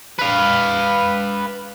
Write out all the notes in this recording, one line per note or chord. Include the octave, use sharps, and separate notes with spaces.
B4 F5